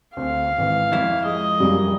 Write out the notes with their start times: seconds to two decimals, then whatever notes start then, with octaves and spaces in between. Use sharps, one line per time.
0.17 D2 C4 F5
0.58 G#1 E3
0.93 F2 E4
1.25 G#3 D#5
1.60 F#2 G3 A#3 G#4